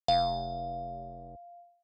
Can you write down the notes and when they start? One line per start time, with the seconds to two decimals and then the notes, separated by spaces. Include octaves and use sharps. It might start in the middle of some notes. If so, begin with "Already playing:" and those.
0.08 F1 F5